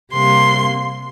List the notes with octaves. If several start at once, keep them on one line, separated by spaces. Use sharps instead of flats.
C3 G3 A#3 C6